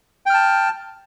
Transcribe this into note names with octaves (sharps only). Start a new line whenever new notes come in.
G5 A5 F6